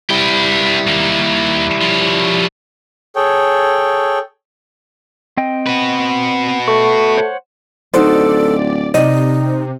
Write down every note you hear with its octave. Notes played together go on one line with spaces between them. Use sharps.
G3 E4 B4 G5
D#2 A#3
F3 C#5
G#4 A4 C#5 G5
C4 D#5 G5
F#4 B4
A3 C#6
C5 C#5 F#5
D1 D#4 F#4 A4 C5 D5
C3 D#4 D5 D#5